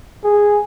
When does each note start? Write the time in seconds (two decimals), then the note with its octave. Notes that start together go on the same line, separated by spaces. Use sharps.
0.24 G#4